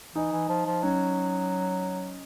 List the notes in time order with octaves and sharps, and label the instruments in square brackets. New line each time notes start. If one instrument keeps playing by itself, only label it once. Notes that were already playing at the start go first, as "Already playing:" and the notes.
[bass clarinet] E3 [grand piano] D#4
[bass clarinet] E3
F3
F3
[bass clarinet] F#3 [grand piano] C#4